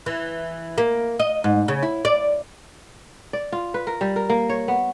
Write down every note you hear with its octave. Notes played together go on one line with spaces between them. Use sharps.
E3
A#3
D#5
G#2
C#3
E4
D5
D5
F4
B4
A#4
G3
A#4
A#3
C#5
B3